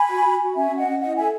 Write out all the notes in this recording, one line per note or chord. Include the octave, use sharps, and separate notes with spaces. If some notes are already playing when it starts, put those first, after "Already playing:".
Already playing: G#5 B5
F#4
F#4
F#4
C#4 E5 G#5
C#4
D#5 F#5
C#4
E4 D#5 F#5
A4 E5 G#5